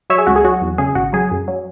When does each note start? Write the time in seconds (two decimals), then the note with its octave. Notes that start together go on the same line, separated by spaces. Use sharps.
0.10 F#3 C#5 E5
0.18 G#4
0.27 C#2 F#4
0.36 G#4
0.44 F#3 F#4
0.61 E2
0.78 C#3 G#4
0.95 G#1 F#4
1.13 F#3 G#4
1.31 F#2
1.48 F#3